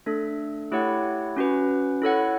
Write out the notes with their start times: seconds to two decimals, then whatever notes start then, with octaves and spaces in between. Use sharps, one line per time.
0.06 A3 D4 A4
0.72 A3 E4 G4 C#5 F#5
1.37 C#4 F#4 B4
2.02 E4 A4 C#5 F#5